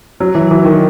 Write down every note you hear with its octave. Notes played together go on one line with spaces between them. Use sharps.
F#3
E3
E3
D#3